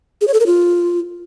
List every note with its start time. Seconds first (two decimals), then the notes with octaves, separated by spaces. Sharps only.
0.21 G#4
0.27 C#5
0.34 A4
0.40 A#4
0.46 F4